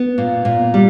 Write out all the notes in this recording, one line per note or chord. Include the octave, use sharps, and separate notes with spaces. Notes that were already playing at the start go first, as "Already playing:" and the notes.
Already playing: B3
A#2
A#2
G3